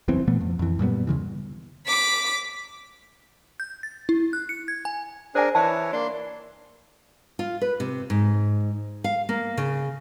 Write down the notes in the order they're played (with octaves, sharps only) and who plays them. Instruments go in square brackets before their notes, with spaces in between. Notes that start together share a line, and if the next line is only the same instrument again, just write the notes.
[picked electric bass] F#1 E2 E3 C4
A#2 E3 A3 B3
F2
F2 E3
F#2 A#2 G3 B3
D#2 C#3 E3
[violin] D6 B6
[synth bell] G6
A6
E4
F#6
C#7
G#6
G#5
[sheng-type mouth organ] D4 A#4 [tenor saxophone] G#4 [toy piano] C5 G#5
[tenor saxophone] E3 [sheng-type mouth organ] C#5 [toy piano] A5
[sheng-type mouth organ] A#3 C6 [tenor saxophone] D4
[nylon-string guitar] F4
B4
C3
G#2
F5
A#3
C#3